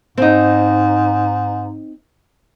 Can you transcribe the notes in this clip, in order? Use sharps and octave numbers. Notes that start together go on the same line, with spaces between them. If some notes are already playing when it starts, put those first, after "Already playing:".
G#2 C4 D#4